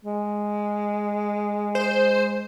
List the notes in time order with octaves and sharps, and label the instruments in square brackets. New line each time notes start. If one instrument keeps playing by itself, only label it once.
[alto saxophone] G#3
[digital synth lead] C5